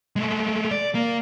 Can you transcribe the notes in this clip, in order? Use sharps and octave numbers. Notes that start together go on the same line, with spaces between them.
G#3 A3
D5
A#3